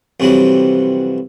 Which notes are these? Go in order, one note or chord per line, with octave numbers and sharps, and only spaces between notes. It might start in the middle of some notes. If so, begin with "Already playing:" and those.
F2 C3 E3 F#3 G3